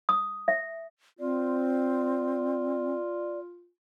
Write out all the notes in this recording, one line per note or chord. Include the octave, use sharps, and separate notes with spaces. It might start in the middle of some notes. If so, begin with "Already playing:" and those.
D#6
E5
C4 F4 D5